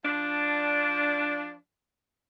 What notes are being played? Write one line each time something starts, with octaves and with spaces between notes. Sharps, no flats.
F3 D4